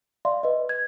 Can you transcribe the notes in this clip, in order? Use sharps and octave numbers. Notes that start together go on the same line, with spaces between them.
D5 E5 F5 C6
B4 D#5
G#6